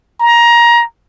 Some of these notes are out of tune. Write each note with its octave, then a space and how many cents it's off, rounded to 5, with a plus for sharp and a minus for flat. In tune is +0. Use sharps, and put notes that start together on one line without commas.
A#5 +20